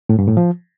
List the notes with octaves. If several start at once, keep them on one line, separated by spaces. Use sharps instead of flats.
A2
G2
A2
F3